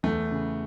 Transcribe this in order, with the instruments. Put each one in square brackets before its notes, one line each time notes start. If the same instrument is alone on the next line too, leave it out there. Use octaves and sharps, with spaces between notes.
[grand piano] E2 A3
C#3